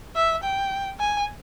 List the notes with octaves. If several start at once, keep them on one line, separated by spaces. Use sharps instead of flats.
E5
G5
G#5